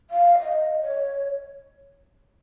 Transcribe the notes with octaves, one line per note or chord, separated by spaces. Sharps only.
F5
D#5
C#5